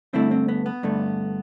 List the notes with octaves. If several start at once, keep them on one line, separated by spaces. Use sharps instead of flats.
G2 D3 A3 C4 E4
C4
B3
B3
G2 D3 A3